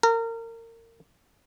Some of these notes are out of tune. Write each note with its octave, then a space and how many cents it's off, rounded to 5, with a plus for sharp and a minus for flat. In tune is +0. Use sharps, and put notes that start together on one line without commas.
A#4 -30